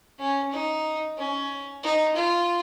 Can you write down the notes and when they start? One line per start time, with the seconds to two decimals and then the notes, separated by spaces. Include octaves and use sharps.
0.19 C#4
0.52 D#4
1.18 C#4
1.84 D#4
2.16 F4